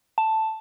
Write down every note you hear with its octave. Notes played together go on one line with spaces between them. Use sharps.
A5